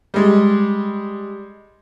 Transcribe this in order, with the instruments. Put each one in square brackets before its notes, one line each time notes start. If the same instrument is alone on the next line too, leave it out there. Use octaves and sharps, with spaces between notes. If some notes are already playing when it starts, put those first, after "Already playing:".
[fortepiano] G3 G#3